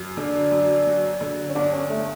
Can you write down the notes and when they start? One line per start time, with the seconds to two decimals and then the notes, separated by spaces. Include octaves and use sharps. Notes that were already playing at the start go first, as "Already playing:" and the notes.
Already playing: F#2
0.17 D3 D4
0.52 F#2
0.86 F#3
1.21 D3
1.49 C#4
1.55 G1 D4
1.73 C#4
1.90 A3